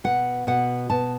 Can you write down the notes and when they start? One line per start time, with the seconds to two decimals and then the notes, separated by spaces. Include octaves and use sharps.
0.04 B2 F#5
0.47 B2 F#5
0.90 B2 A5